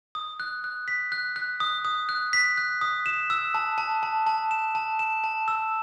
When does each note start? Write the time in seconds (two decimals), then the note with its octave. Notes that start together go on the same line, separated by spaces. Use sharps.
0.15 D#6
0.40 F#6
0.64 F#6
0.88 B6
1.12 F#6
1.36 F#6
1.60 D#6
1.85 D#6
2.09 F#6
2.33 B6
2.57 F#6
2.81 D#6
3.06 E7
3.30 E6
3.54 A5
3.78 A5
4.03 A5
4.27 A5
4.51 E7
4.75 A5
4.99 E7
5.24 A5
5.48 E6